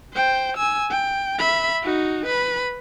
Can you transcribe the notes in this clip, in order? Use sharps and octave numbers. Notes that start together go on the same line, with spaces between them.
C5 G5
G#5 E6
G5
E5 B5
D#4 F#4
B4 B5